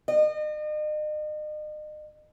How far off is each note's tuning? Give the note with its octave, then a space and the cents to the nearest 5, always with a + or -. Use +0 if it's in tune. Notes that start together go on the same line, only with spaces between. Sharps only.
D#5 -40